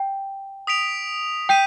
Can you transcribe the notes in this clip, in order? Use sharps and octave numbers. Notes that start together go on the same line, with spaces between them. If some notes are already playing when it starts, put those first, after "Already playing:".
Already playing: G5
D#6 B6 D7 F7
G5 G6 B6 D#7